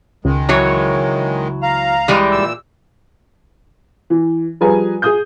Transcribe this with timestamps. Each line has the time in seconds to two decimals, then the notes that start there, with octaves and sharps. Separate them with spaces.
0.25 C#2 D#3 G#3
0.49 E3 F#3 C#5
1.63 F5 A#5
2.08 E3 G3 G#3
2.32 A#2 E6
4.10 E3
4.61 F3 G3 G#4 B4 G#5 A#5
5.02 G#4 D#6 G6